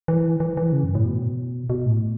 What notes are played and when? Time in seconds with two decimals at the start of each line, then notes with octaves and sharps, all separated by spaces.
0.08 E3
0.40 E3
0.57 E3
0.72 C#3
0.84 F#2
0.95 A2
1.05 B2
1.70 B2
1.86 A2